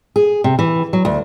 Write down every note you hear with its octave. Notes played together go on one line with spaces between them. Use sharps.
G#4
C3
E3
F#3
D2